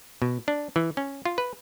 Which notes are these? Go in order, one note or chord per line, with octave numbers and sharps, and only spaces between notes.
B2
D4
E3
C#4
F4
B4